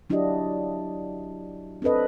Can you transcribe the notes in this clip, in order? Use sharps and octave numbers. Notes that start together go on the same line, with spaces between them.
F#3 D4 E4 F#4 G4 D#5
C4 D4 A4 B4 D#5